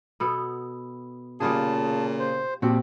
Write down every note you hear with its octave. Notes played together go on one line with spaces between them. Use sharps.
B2 B3 A4
A#2 C#3 G3 F4 G#4 A5
C5
A#2 F3 C4 F#4 G4